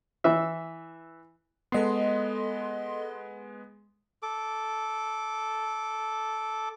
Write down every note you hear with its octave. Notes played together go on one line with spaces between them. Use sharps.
E3 E5
G#3 B3 A4 D#5 C6
A4 D6